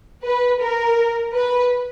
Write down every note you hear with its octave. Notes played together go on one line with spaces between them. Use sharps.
B4
A#4
B4